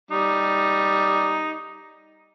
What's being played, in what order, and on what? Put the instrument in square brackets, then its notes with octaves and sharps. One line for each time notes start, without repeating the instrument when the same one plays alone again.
[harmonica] G3 D#4